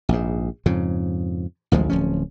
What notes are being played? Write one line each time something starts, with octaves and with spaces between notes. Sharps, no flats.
A#1 G#2
F2 G#2 C#3
A1 D2 F3 G#3
D1 F3 C#4